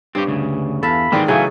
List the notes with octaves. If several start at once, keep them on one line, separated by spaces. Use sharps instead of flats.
G2 C4 G4 C#5
D2 C#3
E2 A4 E5 F5 B5
G#2 D#3 E3 C4 D5
C#3 E3 F#3 A3 C#4 D#4 E4 G#5